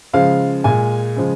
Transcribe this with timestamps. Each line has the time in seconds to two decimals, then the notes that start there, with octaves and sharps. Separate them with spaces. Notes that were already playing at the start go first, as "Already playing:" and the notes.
0.13 C#3 F3 G#3 F5
0.64 A#2 G#3 G#5
1.17 C#3 F3 G#3